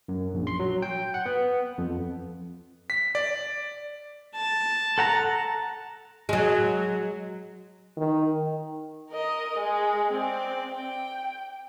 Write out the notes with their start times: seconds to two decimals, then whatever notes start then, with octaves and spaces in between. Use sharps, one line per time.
0.08 F#2
0.33 A#1
0.47 C6
0.60 F#3
0.82 G5
1.14 F#5
1.26 B3
1.78 F2
2.90 B6
3.15 D5
4.35 A5
4.98 A4 F#5 A#5
6.29 F#3 G#3
7.97 D#3
9.11 A#4 D#5
9.58 G#3
10.12 C4 D5
10.74 G5